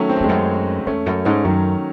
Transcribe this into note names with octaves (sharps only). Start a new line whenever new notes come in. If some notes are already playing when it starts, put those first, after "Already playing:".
Already playing: D#3 F#3 A3 C#4
C4
A3
E2 G#3 C4
F#2
E2 A3 C#4
F#2
G#2 A3 C#4
F#2 D#3 F#3